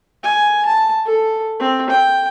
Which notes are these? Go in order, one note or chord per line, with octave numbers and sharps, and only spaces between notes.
G#5
A5
A4
C4
G5